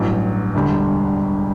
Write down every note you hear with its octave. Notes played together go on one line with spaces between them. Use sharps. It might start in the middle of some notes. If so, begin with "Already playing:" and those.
Already playing: A1 G2 F#3
E1 D2 D3 G3